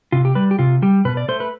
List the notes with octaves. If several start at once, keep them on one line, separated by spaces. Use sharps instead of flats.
C3 F4
G4
G3 B4
G4
C3 F4
G3 G4
B2 B4
D5
A3 C5
B4